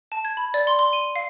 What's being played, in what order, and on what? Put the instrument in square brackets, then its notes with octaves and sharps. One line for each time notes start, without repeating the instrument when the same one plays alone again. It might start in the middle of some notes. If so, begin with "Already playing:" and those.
[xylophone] A5
G#6
B5
D5
C6
C6
D#7
F5